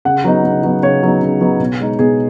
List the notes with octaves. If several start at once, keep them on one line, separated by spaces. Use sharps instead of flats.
C#3 F#5
F#3 B3 D#4
C#3
F#3 B3 D#4
C#3 C#5
F#3 B3 D#4
C#3
F#3 B3 D#4
B2
G#3 D#4
B2 G#4